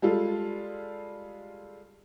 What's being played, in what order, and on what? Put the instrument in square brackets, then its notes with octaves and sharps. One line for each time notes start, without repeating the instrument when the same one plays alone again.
[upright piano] G3 G#3 F4 A4